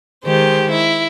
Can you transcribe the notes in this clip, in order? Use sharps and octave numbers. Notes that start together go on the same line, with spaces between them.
D#3 G#3 G4 C5
E4